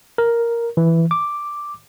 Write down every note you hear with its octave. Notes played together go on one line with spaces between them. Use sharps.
A#4
E3
D6